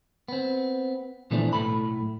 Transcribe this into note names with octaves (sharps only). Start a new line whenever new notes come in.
B3 C4
A#2 E3 F3 A3 B3 D4
B1 A2 A3 B5